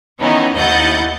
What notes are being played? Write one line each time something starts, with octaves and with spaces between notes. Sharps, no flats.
D#3 E3 B3 C#4 D#4 E4
D#2 E4 D#5 F#5 G6 A6